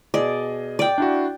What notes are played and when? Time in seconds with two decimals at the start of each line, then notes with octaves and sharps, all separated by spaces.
0.14 B2 G#4 D5 D#5
0.79 D5 G5
0.98 D4 E4 F#4